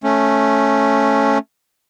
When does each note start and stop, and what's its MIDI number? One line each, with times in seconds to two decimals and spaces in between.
0.03 1.38 57
0.03 1.38 61